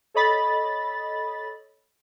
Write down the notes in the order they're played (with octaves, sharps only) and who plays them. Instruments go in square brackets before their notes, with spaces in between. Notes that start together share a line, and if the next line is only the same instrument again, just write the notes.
[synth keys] A4 C#5 D#5 B5 A6